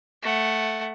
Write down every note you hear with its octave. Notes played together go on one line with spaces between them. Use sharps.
A3 F#5